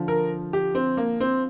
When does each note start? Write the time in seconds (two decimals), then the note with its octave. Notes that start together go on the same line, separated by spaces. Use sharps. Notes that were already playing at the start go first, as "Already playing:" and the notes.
Already playing: D3 F3
0.08 A#4
0.53 G4
0.75 C4
0.97 A#3
1.20 C4